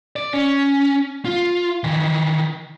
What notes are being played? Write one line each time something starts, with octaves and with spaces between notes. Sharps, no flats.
D5
C#4
F4
D#3 E3